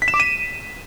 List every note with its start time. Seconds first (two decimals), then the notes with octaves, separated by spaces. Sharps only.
0.02 B6
0.08 E7
0.14 D6
0.20 D#7